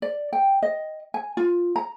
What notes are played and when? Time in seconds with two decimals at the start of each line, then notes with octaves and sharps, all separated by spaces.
0.02 D5
0.33 G5
0.63 D#5
1.14 G#5
1.37 F4
1.76 A#5